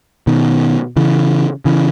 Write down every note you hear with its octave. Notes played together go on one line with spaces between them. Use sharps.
B2 D#3
C#3 E3
C#3 E3